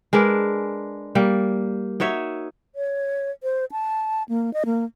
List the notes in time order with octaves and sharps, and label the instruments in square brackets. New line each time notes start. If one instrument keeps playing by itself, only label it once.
[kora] G#3 D4 A#4 B4
G3 A#3
D#4 F#4 C#5 E5
[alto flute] C#5
C5
A5
A#3
D#5
A#3